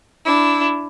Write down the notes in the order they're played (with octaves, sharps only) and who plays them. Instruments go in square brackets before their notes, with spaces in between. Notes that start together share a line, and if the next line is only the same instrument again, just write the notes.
[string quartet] D4 E4